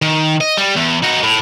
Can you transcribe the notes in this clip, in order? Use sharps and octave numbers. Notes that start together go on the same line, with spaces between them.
D#3
D#5
G3
E2
D#4 F#4
A2